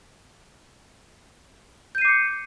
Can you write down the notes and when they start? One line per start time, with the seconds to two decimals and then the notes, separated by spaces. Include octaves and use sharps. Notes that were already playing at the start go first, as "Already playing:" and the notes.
1.95 G6
1.98 D#7
2.01 C7
2.05 D6
2.08 C#7